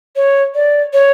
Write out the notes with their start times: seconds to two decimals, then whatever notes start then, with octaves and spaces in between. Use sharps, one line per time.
0.16 C#5
0.55 D5
0.93 C#5